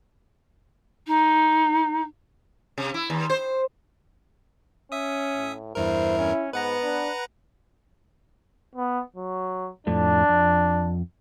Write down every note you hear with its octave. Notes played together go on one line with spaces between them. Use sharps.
D#4
C3
E4
D#2
C5
C#4 E5 D#6
A2
E2 G2 E4 A#4 C5
C#4
G#2 B3 B4 F#5 A#5
D4
B3
F#3
F2 A2 A3 D4
F2